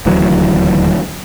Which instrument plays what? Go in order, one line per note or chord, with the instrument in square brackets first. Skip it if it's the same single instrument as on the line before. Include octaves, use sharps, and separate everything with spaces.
[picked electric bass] D#1 D2 E3 F#3